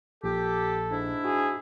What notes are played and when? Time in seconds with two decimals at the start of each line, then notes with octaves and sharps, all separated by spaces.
0.24 A#1 A#2 G4 A4
0.90 G#2 D4 E4
1.25 F#4 G#4